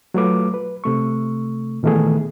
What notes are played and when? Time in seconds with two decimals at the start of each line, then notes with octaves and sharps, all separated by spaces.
0.14 F#3 A3 F4 B4 D6
0.54 B4
0.84 C3 A3 C#6
1.83 A#2 D#3 E3 A3 B3 G#4